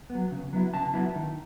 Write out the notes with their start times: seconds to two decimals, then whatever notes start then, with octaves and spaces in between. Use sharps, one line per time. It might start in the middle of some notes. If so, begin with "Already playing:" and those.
0.10 B3
0.15 F#3
0.31 C#3
0.53 F#3 B3 E4
0.74 C#3 A5
0.94 F#3 B3 E4
1.15 D#3